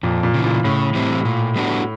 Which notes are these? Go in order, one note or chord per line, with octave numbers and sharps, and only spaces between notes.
F2 A#2
A#2
C#3 E3
A#2
A2 C#3
E3 G3 C4
A#2
G3 B3 D4 F#4